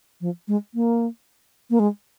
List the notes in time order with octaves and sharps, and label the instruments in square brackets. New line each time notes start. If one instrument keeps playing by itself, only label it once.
[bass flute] F3
G#3
A#3
A#3
G#3